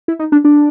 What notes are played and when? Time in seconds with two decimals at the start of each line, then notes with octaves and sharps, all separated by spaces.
0.08 E4
0.19 D#4
0.32 D4
0.45 D4